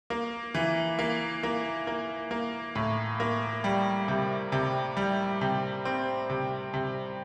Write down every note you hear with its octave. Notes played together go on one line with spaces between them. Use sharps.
A#3
E3
A#3
A#3
A#3
A#3
A2
A#3
G3
C3
C3
G3
C3
C4
C3
C3